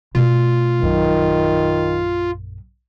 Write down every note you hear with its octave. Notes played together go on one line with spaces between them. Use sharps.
B2 A3 F4
A#1 F#2 D#3